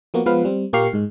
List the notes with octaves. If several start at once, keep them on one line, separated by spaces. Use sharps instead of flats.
F3 A#3 B3 F#4
F3 G#3 B3 F4 B4 F5
G3 C4
A#2 A#3 G4 C#6 F6 C7
G#2 G#3